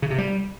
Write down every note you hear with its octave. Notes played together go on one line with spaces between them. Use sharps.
C#3
C3
G3